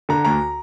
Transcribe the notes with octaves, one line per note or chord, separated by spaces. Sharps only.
D3 A#5
D2 A#5